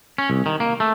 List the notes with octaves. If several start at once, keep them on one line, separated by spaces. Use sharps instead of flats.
C#4
C2
D#3
A#3
A3